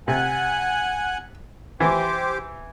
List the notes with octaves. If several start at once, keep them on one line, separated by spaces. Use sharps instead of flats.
C3 F#5 G#5 F#6
E3 G4 C5 D6